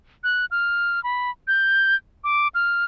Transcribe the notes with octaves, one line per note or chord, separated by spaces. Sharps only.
F#6
F6
B5
G6
D6
F6